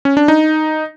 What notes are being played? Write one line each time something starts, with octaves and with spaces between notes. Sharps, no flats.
C#4
D4
D#4